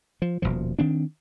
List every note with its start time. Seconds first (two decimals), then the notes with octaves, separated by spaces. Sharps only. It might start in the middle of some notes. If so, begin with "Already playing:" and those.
0.22 F3
0.42 D#1 C2 B2 F3
0.79 D#3 C4 D4